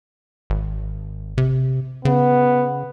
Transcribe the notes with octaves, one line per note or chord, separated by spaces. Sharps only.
G#1
C3
C#3 B3